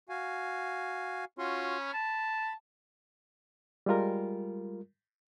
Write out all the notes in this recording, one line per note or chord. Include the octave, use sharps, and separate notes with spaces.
F#4 F5 G#5
C#4 F4 F#4 C6
B5
A5
G3 G#3 F4 A#4